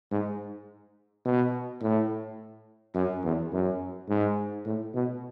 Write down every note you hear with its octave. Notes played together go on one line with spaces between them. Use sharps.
G#2
B2
A2
F#2
E2
F#2
G#2
A2
B2